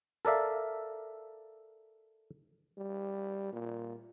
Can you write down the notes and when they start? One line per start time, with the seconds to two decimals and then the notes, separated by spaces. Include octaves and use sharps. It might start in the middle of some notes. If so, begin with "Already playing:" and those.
0.25 A4 A#4 D5 E5 F5
2.78 G3
3.53 A#2